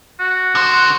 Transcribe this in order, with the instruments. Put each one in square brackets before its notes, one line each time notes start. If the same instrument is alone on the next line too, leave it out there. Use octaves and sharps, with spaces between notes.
[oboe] F#4
[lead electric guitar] D3 C5